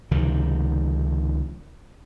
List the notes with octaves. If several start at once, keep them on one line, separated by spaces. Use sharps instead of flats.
C#2 C3 D#3 F3